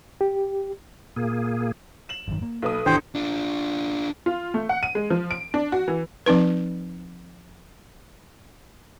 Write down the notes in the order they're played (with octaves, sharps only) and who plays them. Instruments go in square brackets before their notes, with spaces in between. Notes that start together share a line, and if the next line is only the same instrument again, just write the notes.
[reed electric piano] G4
[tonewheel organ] A#2 A#3 G#4
[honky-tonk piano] E7 F#7
[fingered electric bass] G#1 F#2 D#3
A#3
[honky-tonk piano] B1 B4 D#6 [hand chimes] A4
[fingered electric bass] A1 D#3 [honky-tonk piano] E2 [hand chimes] D4 G4 C#7 [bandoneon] C5 G5
[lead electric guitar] D4 F4
[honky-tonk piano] F4
A3
F#5
D#7
G#3
F3
D7
D4
F#4
E3
[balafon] F3 C4 D#4 B4